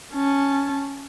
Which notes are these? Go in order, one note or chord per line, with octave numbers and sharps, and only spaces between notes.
C#4 A5